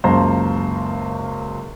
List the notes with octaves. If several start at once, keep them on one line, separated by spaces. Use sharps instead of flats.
C#2 F#2 A#3 C5 A5 A#5